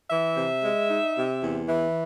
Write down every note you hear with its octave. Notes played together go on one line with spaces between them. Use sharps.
E3 E5
C3
G#3
D#4
C3
E2
E3